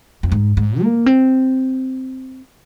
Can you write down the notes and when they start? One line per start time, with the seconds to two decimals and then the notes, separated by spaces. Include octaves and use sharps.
0.23 F2
0.32 G#2
0.57 G#2
0.81 A#3
1.06 C4